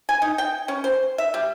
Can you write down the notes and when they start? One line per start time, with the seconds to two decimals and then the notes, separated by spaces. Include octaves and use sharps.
0.09 G#5
0.22 D#4
0.38 G5
0.68 C#4
0.84 C5
1.18 E5
1.34 G3